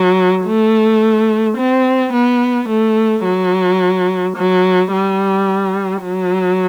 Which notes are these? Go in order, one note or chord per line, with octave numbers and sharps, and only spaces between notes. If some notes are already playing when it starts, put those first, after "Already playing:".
Already playing: F#3
A3
C4
B3
A3
F#3
F#3
G3
F#3